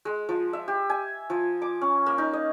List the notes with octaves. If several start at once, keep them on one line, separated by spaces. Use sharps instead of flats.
G#3
F3
E5
G4
G#5
F3
D6
C#4
A#3
D#4
D#5